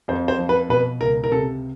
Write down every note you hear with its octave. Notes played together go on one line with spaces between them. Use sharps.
F2 C5
C5
F3
B4
B2 B4
C#2 A#4
A#4
C3 A4